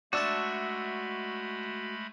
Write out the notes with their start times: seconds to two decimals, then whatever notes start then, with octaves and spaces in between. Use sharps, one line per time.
0.13 G#3 A3 D4 F#4 E5 A5 B5